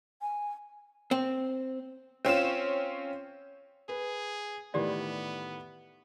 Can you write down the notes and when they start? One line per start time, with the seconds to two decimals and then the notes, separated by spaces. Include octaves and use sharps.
0.21 G#5
1.11 C4
2.25 C4 C#4 F4 E7
3.89 G#4 B4
4.74 A2 D#3 E3 B3 G4 D5